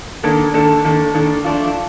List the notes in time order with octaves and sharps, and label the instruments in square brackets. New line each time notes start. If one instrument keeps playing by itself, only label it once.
[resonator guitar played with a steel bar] D#3 A#3 D4 A4
D#3 A#3 D4 A4
D#3 A#3 D4 A4
D#3 A#3 D4 A4
F3 A3 D4 F4